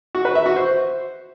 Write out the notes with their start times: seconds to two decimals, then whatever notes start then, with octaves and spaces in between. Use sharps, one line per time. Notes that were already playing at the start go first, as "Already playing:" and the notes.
0.15 F#4
0.25 B4
0.35 E5
0.46 F#4
0.56 C5